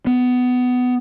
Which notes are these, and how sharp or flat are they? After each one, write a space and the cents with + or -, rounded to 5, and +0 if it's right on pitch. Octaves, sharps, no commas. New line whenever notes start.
B3 +15